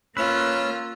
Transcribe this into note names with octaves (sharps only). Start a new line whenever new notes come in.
A#3 C#4 F4 B4 E6